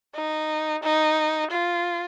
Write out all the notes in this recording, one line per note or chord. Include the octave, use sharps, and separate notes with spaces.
D#4
D#4
F4